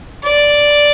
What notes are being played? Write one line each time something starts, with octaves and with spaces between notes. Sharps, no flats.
D5